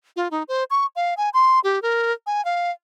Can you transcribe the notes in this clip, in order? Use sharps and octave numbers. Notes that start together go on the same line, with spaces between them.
F4
D#4
C5
C#6
F5
G#5
C6
G4
A#4
G#5
F5